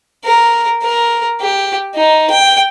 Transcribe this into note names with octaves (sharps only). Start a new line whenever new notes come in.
A#4
A#4
G4
D#4
G5